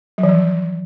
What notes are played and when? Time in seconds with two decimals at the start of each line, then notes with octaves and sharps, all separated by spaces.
0.18 F#3
0.23 E3
0.29 F3